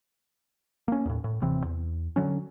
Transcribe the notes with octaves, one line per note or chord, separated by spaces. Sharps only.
A#3 C#4
D#2 A2
A2
D#1 C3 E3 C4
E2
D3 F#3 C#4